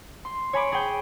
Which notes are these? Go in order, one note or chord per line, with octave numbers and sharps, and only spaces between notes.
C6
C#5 G#5 B5 D6
G#4 G5